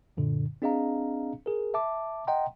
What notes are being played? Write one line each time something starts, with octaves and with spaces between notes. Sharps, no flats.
F#2 A#2 D3
C4 D4 G#4 D#5 F5 A#5
G#4 A#4
E5 A5 D6
D#5 F#5 G5 A#5 C6